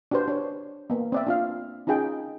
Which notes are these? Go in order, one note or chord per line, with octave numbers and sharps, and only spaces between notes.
D4 F#4 G4 B4 C5
D4 C#5
A#3 B3
C4 D5 E5
D4 F4 F5
C#4 D#4 F4 G#4 G5